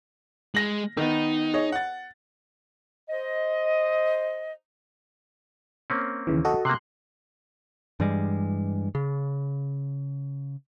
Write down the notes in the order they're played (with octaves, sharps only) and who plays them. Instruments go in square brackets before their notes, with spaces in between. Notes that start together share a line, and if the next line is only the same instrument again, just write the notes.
[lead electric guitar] G#3 [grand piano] A#6 F#7
[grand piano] D#3 B3 [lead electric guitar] D#4
[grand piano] G#4 C#5 D#5
F#5 A6
[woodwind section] C5 D#5
[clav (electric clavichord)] A#3 C4 C#4
[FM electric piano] D#2 C#3 E3
F#4 A4 D#5
[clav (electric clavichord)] C3 A#3 [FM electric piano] C6 F#6
[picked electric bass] G2 E3 G3 G#3
C#3